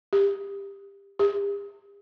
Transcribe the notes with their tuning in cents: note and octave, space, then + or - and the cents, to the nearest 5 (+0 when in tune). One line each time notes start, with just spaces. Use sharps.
G4 +20
G4 +45